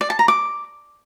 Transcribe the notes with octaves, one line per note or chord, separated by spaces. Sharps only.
D5
A5
A#5
D6